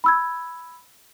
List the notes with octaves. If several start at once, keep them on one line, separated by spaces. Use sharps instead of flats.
B5 E6 G#6